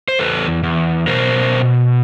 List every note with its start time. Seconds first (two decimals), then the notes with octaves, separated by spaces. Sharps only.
0.08 C5
0.19 E2 A4 B4
0.63 E2
1.07 B2 A#4 C5